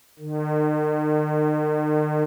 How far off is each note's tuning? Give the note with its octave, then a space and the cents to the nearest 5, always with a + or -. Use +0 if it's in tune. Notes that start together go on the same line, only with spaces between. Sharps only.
D#3 -45